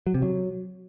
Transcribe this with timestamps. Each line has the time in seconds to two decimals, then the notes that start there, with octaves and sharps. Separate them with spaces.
0.07 F#3
0.14 C3
0.22 F#3